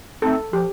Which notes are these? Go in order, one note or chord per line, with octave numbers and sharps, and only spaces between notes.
A3 C4 D#4 A4
F3 G4